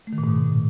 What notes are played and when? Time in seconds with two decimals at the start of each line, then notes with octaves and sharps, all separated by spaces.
0.07 A3
0.13 D#3
0.18 A#2
0.24 G#2
0.29 B2